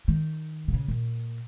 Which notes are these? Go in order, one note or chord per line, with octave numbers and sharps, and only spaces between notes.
D#3
A#2
C#3
A#2